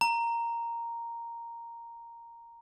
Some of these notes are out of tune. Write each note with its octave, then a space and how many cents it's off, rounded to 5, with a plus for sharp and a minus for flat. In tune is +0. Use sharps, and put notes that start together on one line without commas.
A#5 -5